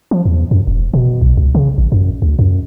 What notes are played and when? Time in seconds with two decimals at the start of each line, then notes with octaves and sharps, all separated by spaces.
0.11 F3
0.25 E2
0.51 F#2
0.67 E1
0.94 B2
1.21 B1
1.37 C#2
1.55 C#3
1.78 A1
1.92 F#2
2.22 D2
2.39 F#2